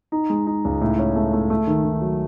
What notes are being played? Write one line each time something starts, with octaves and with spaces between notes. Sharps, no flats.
D#4
G#3
D#4
C#2
A2
C#4
A3
A3
A3
D#3
D#3
F#3